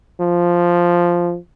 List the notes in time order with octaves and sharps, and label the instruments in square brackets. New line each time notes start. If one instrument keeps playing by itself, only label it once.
[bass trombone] F3